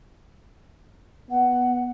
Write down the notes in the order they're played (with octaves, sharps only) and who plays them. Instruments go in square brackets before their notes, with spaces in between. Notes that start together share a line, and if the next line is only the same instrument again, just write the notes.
[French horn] B3 [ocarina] F#5